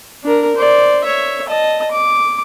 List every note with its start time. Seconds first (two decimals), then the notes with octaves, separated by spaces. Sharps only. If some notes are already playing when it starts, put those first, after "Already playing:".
0.24 D4 A#4
0.56 C5 D5
1.04 C#5 E5
1.48 D#5 A5
1.91 D6